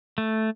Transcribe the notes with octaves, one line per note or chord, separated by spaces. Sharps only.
A3